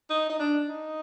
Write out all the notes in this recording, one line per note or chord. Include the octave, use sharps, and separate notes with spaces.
D#4
D#4
D4
D#4